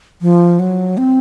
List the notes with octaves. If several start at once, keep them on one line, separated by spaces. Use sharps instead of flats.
F3
F#3
C4